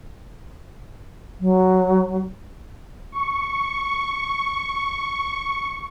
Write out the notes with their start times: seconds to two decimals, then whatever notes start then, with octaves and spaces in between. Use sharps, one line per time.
1.40 F#3
3.12 C#6
4.11 C#6